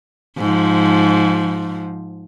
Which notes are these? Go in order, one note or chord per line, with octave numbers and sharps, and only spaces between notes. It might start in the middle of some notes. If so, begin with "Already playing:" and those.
G#2 F3